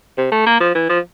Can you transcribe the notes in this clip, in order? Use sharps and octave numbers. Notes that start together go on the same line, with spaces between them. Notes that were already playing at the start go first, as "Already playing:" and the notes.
C3
A3
A#3
F3
E3
F3